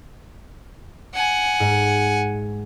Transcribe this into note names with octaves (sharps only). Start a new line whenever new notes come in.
F#5 G#5
G#2